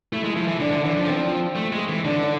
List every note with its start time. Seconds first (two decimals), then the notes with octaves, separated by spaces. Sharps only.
0.12 A3 E4
0.24 G#3
0.37 F3
0.48 E3
0.60 D3 D4
0.72 D3
0.85 E3 D4
0.97 F3 D4
1.08 C4
1.56 A3
1.72 G#3
1.88 E3
2.04 D3 D4
2.23 D4